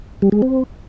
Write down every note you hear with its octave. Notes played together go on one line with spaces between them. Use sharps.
G3
G#3
C4